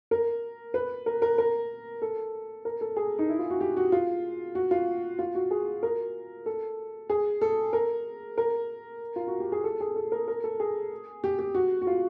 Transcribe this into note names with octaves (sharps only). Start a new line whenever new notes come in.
A#4
B4
A#4
A#4
A#4
A4
A#4
A4
G#4
D#4
E4
F4
F#4
G4
F#4
F4
F#4
F4
F4
F#4
G#4
A#4
A4
G#4
A4
A#4
A#4
F4
F#4
G4
G#4
A4
G#4
A4
A#4
A#4
A4
G#4
G4
G4
F#4
F#4
F4